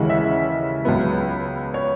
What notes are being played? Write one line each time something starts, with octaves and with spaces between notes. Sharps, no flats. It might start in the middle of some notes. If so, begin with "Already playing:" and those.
Already playing: D#2 C#3 E3 G#3 F#5
E5
C#2 C#3 F#3 B3
C#5